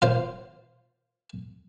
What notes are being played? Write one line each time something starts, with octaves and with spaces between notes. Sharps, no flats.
F4 C5